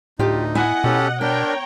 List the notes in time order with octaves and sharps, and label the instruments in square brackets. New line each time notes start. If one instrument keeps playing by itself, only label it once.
[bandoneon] D2 D#4 [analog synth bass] A2 [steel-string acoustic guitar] F4 G4
[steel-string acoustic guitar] B3 E4 G#5 [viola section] D#5 F#5
[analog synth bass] B2 [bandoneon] C#4 G4 A4
[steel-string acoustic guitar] B3 [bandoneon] D4 A#4 [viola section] C#5 G5 A#5